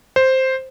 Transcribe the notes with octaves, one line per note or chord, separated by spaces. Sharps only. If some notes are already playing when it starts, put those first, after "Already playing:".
C5